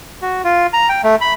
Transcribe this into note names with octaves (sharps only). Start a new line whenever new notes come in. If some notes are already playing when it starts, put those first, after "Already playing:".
F#4
F4
A#5
G5
A3
B5